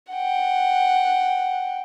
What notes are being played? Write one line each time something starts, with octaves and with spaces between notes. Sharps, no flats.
F#5 G5